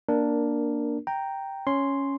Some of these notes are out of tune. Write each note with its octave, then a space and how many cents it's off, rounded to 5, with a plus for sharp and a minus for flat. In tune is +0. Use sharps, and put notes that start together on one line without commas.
A#3 +15 D4 +0 A#4 +0
G5 +0 A#5 -5
C#4 +0 C#5 +0 C6 +0